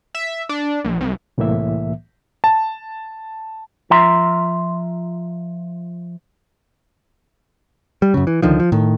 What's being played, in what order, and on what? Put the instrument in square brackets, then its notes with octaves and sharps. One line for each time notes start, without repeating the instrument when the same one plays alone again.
[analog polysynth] E5
D4
A#1
C2
[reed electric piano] C2 A2 E3 A#3 E5
[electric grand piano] A5
[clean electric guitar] F3 F4 E5 A#5 C6
[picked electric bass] G3
F#2 C#3
E3
C#2 D3 D#3 F3
F3
A2 D#3